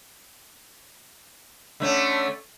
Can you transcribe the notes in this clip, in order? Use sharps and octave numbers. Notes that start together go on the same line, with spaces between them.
D3 A3 C#4